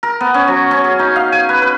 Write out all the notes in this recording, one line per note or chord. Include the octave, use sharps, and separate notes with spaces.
A#4
B3
C#4
F#3
C#4
G#4
D#4
F5
G#5
B4
B4